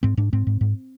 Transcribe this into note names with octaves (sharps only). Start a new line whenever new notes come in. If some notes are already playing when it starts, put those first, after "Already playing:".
G#2 C4
G#2 D4
G#2 C4
G#2
G#2